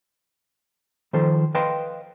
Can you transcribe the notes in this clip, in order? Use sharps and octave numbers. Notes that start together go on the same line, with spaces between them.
D#3 F3 A4 C5
B4 D#5 F5 G5 A5 C6